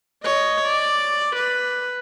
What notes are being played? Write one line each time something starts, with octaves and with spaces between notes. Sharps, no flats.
C#5 D#5
D5
B4